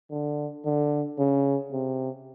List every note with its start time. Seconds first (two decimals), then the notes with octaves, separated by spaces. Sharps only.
0.11 D3
0.65 D3
1.19 C#3
1.72 C3